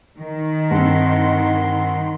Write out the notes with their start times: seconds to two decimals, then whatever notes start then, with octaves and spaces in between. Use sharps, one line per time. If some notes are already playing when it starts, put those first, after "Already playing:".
0.18 D#3
0.71 G2 C4 F#5 C6